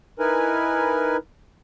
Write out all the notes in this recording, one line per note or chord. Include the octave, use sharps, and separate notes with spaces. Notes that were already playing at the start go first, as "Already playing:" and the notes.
D#4 E4 A#4 B4 G#5